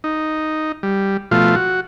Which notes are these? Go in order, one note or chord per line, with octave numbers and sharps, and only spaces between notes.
D#4
G3
B2 F3 A3 F4
F#4